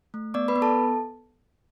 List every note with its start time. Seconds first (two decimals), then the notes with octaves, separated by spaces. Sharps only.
0.14 A3
0.34 B3 D5 D6
0.48 B4 B5
0.56 B3
0.62 A4 A5